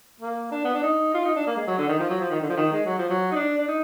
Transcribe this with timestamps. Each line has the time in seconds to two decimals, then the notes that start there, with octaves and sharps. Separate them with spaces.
0.20 A#3
0.51 D4
0.65 B3
0.74 D4
0.83 D#4
1.14 F4
1.25 D#4
1.36 D4
1.47 A#3
1.56 G#3
1.67 F#3
1.78 D3
1.88 D#3
1.99 F3
2.10 F#3
2.20 F3
2.30 D#3
2.41 D3
2.49 F3
2.57 D#3
2.73 G#3
2.85 F#3
2.98 F3
3.10 F#3
3.31 D#4
3.35 D4
3.58 D4
3.68 D#4